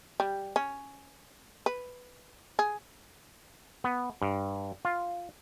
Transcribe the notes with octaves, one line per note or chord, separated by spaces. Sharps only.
G3
C#4
B4
G#4
B3
G2
F4